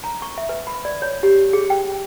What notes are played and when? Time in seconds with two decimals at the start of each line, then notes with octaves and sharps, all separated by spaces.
0.04 A#5
0.22 C#6
0.38 E5
0.49 B4
0.67 B5
0.85 D5
1.02 C#5
1.23 G4
1.53 G#4
1.70 G5